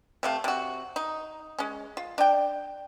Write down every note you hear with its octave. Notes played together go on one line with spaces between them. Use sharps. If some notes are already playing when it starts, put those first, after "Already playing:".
C3 A3 F5
C3 F#4
D#4
G#3 C#4
F4
D4 G5